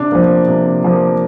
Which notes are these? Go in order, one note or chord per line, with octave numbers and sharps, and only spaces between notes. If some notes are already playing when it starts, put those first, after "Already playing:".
Already playing: C3 D4
F3 A#3
C3
F3 A#3